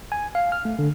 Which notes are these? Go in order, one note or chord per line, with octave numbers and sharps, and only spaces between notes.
G#5
F5
F6
A3
D3